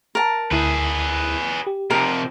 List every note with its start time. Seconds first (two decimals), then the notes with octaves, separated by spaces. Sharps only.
0.15 A#4 A5
0.51 D2 E4 G#4 B4
1.67 G4
1.90 C3 F3 A#4